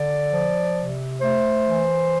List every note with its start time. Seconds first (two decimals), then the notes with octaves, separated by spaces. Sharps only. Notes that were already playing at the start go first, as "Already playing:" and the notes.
Already playing: D3 D5
0.30 F3
0.75 C3
1.21 A3 C5
1.66 E3